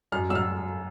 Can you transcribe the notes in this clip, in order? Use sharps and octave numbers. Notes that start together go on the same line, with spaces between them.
F#2 F6
F#3 E6
F6